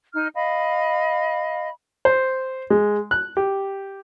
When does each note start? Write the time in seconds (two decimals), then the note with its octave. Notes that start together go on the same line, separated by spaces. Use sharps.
0.14 D#4 D#5 F6
0.35 D#5 F5 B5
2.05 C5
2.70 G#3
3.11 F#6
3.37 G4